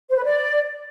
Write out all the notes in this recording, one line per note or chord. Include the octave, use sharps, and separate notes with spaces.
C5
B4
D5